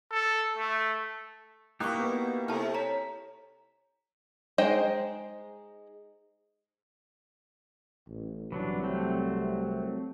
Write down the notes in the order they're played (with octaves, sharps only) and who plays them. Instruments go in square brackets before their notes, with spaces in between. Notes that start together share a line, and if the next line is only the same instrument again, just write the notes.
[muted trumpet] A4
A3
[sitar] B2 E4 [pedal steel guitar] A#3 D#4 G4 [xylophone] C#6 D6 F#6
[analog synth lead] B3
[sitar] C3 [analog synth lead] E4 [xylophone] A4 A5 F6
[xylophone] C#5 A#5 [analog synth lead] B6
[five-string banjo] G#3 D#4 C5 D#5 G5
[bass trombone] A1
[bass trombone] C2 [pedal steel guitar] E3 F#3 D4
[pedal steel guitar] F#3 A3 C4